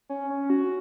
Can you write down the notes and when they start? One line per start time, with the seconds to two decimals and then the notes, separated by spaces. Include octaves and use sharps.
0.09 C#4
0.30 C#4
0.50 F#4